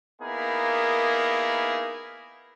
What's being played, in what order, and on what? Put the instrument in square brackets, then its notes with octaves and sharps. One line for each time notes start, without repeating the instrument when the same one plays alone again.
[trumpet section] A#3 B3 D#4 E4 G#4 A#4